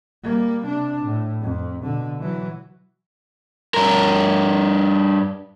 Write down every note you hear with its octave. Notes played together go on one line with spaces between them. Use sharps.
G3 A#3
C3 D4
A2
F2
B2 D3
E3 F#3
G2 A#4